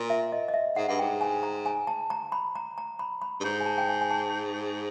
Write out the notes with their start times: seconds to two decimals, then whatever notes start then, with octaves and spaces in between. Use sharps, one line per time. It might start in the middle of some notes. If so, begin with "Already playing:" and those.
Already playing: A#2
0.10 E5
0.32 D#5
0.48 D#5
0.54 E5
0.76 G#2 F#5
0.88 G2 F#5
0.99 G#2 G5
1.21 G#5
1.43 A#5
1.66 G#5
1.87 A5
2.10 A#5
2.32 B5
2.55 A#5
2.78 A#5
2.99 B5
3.22 B5
3.40 G2
3.44 G#2 A#5
3.60 G#5
3.66 A5
3.78 G5
3.89 G#5
4.01 G#5
4.11 A5